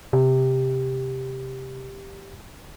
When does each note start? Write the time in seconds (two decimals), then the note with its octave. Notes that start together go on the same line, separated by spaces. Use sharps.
0.13 C3 G4